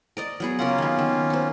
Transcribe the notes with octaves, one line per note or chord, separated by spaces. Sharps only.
A#4 D5 D#5
F#3 B3 G#4
C#3 A#3 C#4 F4 A#4 F#5
D#3 B3
D#3
F#4 C5